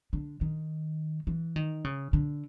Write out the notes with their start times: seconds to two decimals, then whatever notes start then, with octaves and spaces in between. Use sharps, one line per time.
0.13 D3
0.41 D#3
1.27 E3
1.56 D#3
1.84 C#3
2.13 D3